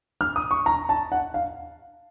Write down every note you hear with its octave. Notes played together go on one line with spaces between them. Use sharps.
F6
D#6
C#6
A#5
A5
F#5
F5